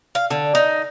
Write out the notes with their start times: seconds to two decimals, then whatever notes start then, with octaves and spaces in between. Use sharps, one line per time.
0.15 F5
0.31 D3
0.55 D#4